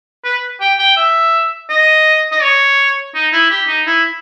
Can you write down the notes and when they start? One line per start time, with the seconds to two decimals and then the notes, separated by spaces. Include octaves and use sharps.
0.25 B4
0.61 G5
0.79 G5
0.97 E5
1.70 D#5
2.32 D#5
2.42 C#5
3.14 D#4
3.33 E4
3.50 G4
3.68 D#4
3.86 E4